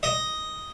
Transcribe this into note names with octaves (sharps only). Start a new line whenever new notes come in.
D#5